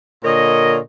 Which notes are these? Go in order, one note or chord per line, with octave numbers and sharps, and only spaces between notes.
A#2 D3 A#4 C#5 D#5